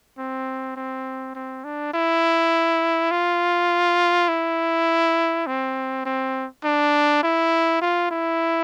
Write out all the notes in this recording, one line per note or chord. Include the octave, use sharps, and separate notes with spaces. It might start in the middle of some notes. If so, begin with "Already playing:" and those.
C4
C4
C4
D4
E4
F4
E4
C4
C4
D4
E4
F4
E4